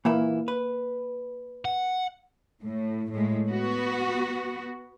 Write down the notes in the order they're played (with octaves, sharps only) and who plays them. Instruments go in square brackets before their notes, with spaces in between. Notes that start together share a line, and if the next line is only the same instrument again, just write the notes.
[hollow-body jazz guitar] A#2 E3 E4 [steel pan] A#3
[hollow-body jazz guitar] B4
[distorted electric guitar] F#5
[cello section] A2
A2 G#3
B3 F#4